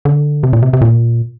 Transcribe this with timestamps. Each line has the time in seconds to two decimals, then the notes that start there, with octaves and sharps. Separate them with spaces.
0.05 D3
0.43 C3
0.53 A#2
0.62 C3
0.73 C3
0.81 A#2